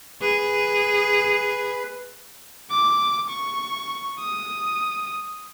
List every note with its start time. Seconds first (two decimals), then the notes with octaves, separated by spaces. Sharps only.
0.21 G#4 B4
2.70 D6
3.30 C#6
4.19 D#6